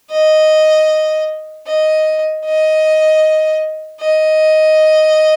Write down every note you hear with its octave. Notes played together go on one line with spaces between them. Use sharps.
D#5
D#5
D#5
D#5